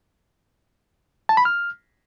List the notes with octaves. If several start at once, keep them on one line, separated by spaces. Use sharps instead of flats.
A5
B5
F6